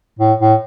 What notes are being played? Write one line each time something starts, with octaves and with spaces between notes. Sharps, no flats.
A2
A2